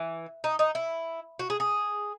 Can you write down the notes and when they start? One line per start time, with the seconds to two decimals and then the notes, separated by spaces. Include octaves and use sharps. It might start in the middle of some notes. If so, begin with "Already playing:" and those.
Already playing: E3
0.44 D#4
0.59 D#4
0.75 E4
1.39 F#4
1.50 G#4
1.60 G#4